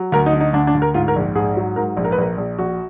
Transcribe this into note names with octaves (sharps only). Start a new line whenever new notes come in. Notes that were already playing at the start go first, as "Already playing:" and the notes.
Already playing: F#3
D2 A#4
D#4
D3
D#4
D2 D4
D4
D2
A#4
G#2 F4
A#4
A#1
G#2 G#4
F#3
G#2 A#4
A#1
A#4
B4
A#1 A#4
A#1
A#1 F#4